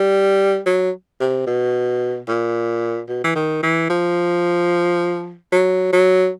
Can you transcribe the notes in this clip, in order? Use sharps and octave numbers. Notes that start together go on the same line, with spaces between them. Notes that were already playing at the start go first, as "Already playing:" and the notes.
Already playing: G3
F#3
C3
B2
A#2
B2
E3
D#3
E3
F3
F#3
F#3